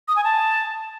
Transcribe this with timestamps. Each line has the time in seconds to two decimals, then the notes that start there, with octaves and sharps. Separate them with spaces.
0.08 D#6
0.16 G#5
0.24 A5